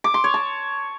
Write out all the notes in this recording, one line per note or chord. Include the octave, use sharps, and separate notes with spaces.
D6
C6
C#5
A5